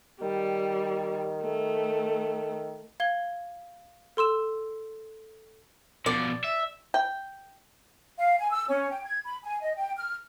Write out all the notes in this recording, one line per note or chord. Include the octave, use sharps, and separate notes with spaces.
D#3 G3
A3
F5 G#6 G7
A4 C6 E6 E7
B2 F3 D5
E5
G5
F5
G#5
E6
C#4
G5
G#6
B5
G#5
D#5
G5
F6